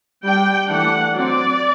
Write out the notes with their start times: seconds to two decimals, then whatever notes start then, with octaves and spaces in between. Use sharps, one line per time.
0.23 G3 D4 G5
0.69 E3 A3 D4 F#5
1.14 F#3 C4 D5